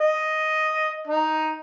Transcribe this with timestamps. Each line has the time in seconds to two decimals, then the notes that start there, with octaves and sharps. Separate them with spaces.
0.01 D#5
1.07 D#4